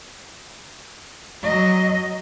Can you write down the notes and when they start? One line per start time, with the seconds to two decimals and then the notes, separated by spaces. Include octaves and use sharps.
1.43 F#3 D#5